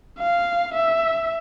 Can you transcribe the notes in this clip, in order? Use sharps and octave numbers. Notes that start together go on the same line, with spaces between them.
F5
E5